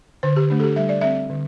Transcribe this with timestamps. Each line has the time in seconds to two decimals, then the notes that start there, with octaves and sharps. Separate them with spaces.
0.23 D3 C5
0.36 G4
0.50 A3 D4
0.60 A4
0.63 G4
0.76 G3 E5
0.89 D5
1.01 C4 E5
1.30 D3